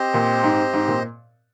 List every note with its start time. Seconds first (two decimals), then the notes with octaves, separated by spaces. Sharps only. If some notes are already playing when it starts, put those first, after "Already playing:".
Already playing: C4 G4 C5 D#5
0.14 A#2
0.43 G#2
0.74 G#2
0.88 A#2